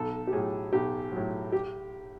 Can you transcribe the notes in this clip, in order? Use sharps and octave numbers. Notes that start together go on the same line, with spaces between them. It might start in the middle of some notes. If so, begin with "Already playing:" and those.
Already playing: B1 A4
G4
A2 F#3 G#4
B1 G4
A2 F#3
G4